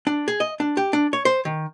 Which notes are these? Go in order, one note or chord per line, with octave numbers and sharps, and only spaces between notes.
D4
G#4
D#5
D4
G4
D4
C#5
C5
D#3